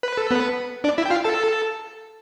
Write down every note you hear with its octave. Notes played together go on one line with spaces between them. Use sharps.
B4
A4
B3 B4
D4 D5
E4 E5
G5
F4 F5
A4 A5